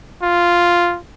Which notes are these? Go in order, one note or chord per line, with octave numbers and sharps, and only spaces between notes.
F4